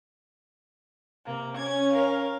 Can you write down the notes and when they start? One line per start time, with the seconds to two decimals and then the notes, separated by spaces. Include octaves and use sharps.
1.25 C3 A#3
1.56 C#4 G#6
1.93 A#4 F5